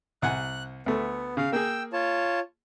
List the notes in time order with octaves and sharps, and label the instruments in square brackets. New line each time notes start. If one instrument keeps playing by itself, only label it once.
[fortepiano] C2 F#5 G#5 [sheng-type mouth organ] F#6
[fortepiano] D2 A3 [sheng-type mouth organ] B3
[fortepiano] C#3 [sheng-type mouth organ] F5
[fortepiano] A#3 G#4 [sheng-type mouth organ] G5 E6
[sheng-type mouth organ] F4 C#5 A5